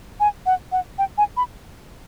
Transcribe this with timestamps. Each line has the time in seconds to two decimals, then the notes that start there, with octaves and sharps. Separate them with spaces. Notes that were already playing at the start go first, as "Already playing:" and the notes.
0.20 G#5
0.46 F#5
0.72 F#5
0.98 G5
1.18 G#5
1.37 B5